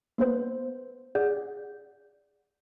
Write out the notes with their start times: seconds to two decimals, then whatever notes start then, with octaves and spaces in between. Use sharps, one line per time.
0.18 A#3 B3 B4 C5
1.15 G#4 D5 F#5 G6